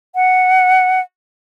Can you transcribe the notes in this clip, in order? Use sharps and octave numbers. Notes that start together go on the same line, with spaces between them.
F#5